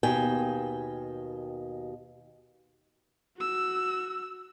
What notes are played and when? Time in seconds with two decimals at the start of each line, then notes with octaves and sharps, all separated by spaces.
0.03 D#2 B2 G5 G#5
3.37 F#4 E6